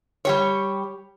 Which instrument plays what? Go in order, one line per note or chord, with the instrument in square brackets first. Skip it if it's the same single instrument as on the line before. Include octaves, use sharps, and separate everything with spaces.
[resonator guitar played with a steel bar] G3 G4 C#5